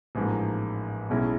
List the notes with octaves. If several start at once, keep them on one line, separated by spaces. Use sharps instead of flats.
A1 G#2 F3 A#3
B1 B2 G#3 C#4 E4